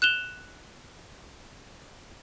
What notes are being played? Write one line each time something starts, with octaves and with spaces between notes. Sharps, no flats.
F#6 E7 F7 G7